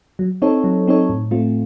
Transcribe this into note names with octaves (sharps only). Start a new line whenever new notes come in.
F#3
C4 D#4 A4 C#5
F#3
C4 D#4 A4 C#5
A2
A3 C4 F4